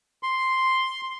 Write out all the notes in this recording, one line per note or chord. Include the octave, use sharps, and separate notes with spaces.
C6